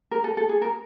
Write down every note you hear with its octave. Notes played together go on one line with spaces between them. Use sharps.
A#4
A4
A4
G#4
A#4